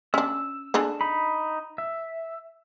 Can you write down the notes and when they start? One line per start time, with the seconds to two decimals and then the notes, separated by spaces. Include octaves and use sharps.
0.14 C#4 D4 E6
0.74 D4 G#4 A4
1.01 D#4 B5
1.78 E5